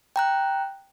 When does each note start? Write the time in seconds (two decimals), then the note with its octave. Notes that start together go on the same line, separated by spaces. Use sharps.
0.16 G5 A#5 F#6